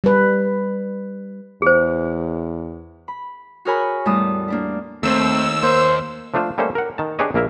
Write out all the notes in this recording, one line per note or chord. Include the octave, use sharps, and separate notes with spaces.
G3 B4
E2 G#4 C5
B5
F#4 G#4 A#4 C#5 G#5 B5
E2 A2 G3 B3 A5 D#6
A#3 D4 E4
D#2 A3 C4 C5 E6
A#3 C5
F3 A3 D4 F4 C5
G3 A3 A#3 C#4 A4 C5
A#4 F#5
D#3 A5
D4 G4 G#4 B4 C#5 D#5
A#1 A#3 E4 A#4 E5